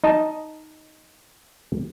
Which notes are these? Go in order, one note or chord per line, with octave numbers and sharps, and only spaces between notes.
D#4 D#5 A5